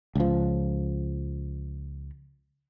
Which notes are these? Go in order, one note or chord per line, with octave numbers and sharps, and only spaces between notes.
C#2 F3